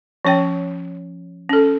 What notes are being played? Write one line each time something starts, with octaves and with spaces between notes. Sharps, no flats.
F3 C#4 C#5 G5
C#4 A4